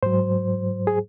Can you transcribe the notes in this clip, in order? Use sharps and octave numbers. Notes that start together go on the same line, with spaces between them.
G#2 F#3 C5
G#4